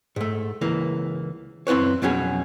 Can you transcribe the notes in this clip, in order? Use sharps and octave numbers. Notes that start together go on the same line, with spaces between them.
G#2 A3
C#2 E3 A#3
F#2 C4 E4 B4 C#5
B1 F2 B2 F#3 C#4 G#4